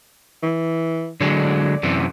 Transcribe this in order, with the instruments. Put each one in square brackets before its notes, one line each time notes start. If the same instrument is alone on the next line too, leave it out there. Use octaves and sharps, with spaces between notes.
[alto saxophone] E3
[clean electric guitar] D3 F#3 G#3 [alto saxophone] D5
[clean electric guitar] F#2 C3 E3